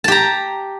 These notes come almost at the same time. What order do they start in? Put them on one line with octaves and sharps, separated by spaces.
A5 G4 A#5